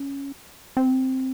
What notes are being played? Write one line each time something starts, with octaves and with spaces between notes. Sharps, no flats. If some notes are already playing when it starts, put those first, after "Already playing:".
Already playing: C#4
C4